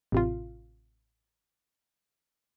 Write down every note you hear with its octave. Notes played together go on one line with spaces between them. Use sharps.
A1 C3 F4